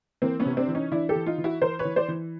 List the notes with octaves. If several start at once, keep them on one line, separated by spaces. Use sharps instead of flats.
E3 A#3 C4
B3 C#4
C3
C4 D4
E3
C#4 D#4
E3 D4 E4
G4 A4
E3
D#4 F4
E3
E4 F#4
E3 A#4 C5
B4 C#5
E3
C5 D5
E3